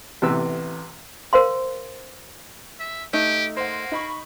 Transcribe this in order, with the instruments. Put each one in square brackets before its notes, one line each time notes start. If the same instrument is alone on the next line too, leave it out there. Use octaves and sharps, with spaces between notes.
[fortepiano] A1 C3 E3 B3 B4 E6
[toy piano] A#4 C5 F5 C6
[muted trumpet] E5
[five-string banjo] A3 D#4 [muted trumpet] G4
[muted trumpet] A#3 [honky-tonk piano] C5 F#5
[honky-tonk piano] D#4 B5 C#6